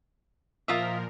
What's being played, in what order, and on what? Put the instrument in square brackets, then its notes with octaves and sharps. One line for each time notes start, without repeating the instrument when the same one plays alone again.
[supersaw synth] A#2 F3 A#4 [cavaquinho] F4 D#5 E5